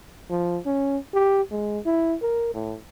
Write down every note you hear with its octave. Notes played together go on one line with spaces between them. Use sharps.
F3
C#4
G4
G#3
E4
A#4
A2